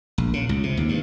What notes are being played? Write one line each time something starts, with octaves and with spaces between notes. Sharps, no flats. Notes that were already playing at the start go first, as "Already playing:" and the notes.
A#1
C#3
C#2
C3
D#2
G2